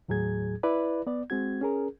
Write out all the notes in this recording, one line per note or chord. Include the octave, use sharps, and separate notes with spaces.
D#2 A2 F#3 G#4 G#6
E4 B4 D5
B3 D5
G#3 C4 F#4 G#6
C#4 G#4 A#4